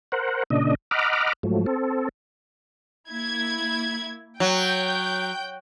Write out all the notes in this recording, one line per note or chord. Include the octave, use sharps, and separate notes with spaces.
A#4 C5 F#5
A#2 C#3 D4 D#5
D#5 F#5 A#5 B5 D6 F6
G#2 F3 F#3 A3
C4 A4
A#3 E4 G#6
F#3 G5 G6